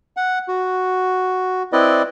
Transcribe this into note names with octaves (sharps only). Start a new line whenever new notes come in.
F#5
F#4
C4 E4 B4 D5 D#5